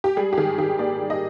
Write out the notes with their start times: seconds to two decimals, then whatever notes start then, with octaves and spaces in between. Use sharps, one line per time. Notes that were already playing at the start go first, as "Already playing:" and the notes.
0.04 G4
0.17 G3 G#4
0.33 G4
0.38 D#3 G#4
0.58 D#3 G4
0.79 A#3 D5
1.00 G3
1.10 D#5